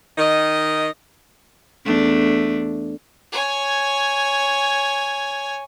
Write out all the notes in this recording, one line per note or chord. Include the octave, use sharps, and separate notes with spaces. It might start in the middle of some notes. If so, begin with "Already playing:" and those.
D#3 D#5
E2 A3 D4
C#5 G#5